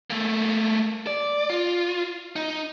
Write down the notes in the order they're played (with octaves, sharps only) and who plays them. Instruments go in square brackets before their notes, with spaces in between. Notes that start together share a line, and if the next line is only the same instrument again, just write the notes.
[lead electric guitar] A3 A#3
D5
F4
D#4